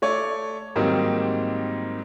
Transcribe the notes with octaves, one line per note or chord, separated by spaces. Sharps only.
A3 C#5 D5
G#2 D#3 F#3 G3 A#3 C4